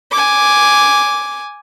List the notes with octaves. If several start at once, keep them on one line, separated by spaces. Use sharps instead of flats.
G#5 D6